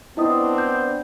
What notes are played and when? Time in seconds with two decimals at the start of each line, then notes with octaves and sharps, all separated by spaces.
0.17 B3 C4 D4 E4 D#5 D#6
0.58 G6